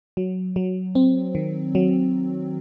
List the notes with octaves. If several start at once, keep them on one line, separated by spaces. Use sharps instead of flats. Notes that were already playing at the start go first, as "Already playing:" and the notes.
F#3
F#3
C4
D#3
F#3